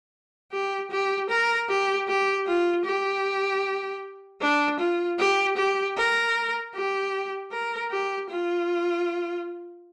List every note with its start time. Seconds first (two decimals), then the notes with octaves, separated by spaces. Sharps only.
0.52 G4
0.91 G4
1.30 A#4
1.69 G4
2.08 G4
2.47 F4
2.85 G4
4.41 D4
4.80 F4
5.19 G4
5.57 G4
5.97 A#4
6.74 G4
7.51 A#4
7.91 G4
8.29 F4